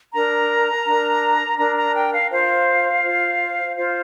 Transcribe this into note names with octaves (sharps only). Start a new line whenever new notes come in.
D4 A#4 A#5
D4 A#4
D4 A#4 A#5
A#5
G5
F5
F4 C5 F5
F4 C5
F4 C5 F5